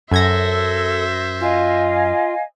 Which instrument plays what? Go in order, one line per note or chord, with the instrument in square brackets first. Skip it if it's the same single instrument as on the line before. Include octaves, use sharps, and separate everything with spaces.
[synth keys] F#2 G#6 A#6 [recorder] A4 [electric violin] C5 E5
[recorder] F4 [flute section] D#5 F5 G#5